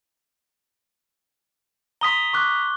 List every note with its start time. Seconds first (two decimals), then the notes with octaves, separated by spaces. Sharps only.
2.01 A#5 C6 D#6 B6 G7
2.33 C#6 D6 F#6